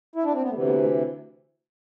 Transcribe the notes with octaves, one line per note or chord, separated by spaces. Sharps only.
E4
D4
C4
B3
D2 C3 E3 A3
B3
A3